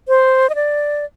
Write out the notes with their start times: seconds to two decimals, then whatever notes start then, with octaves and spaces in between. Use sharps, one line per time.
0.08 C5
0.49 D#5
0.55 D5